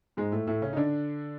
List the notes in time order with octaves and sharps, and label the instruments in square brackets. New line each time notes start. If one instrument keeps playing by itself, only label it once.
[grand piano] G#2 G#3
A2 A3
A2 A3
C#3 C#4
D#4
D3 D4